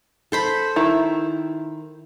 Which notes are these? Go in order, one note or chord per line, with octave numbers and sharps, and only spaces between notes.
A4 C5 B5
D#3 E4